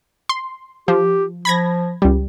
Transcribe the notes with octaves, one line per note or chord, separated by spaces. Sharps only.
C6
F3 G4
F3 B5 G#6 A#6
C#2 G3